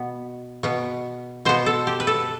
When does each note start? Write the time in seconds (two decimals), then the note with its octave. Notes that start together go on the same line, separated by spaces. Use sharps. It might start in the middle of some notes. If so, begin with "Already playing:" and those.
Already playing: B2 B3
0.63 B2 B3
1.45 B2 B3 C5
1.66 A4
1.87 G4
2.00 B4
2.07 A4